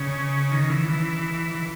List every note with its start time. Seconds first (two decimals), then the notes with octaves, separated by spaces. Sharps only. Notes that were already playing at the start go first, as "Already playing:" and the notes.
Already playing: C#3
0.51 D#3
0.70 E3
0.89 E3
1.55 E3